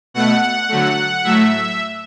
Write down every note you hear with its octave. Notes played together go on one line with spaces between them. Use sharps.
B2 A3 F#5
D3 F#3 A3
A2 F#3 A3 E5